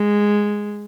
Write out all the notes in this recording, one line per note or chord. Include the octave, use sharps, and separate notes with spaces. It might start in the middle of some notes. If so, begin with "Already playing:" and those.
Already playing: G#3